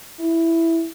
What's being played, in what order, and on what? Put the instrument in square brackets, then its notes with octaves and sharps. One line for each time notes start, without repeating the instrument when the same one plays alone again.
[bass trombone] E4